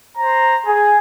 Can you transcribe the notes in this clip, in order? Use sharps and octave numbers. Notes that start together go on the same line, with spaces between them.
C5 A#5
G#4